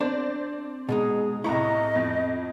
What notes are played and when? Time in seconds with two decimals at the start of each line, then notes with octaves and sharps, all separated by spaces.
0.01 C4 D4 C5 D5
0.89 B2 G#3 D#4 G#4
1.44 C2 A2 A3 E4 D#5 A#5 C#6
1.95 F2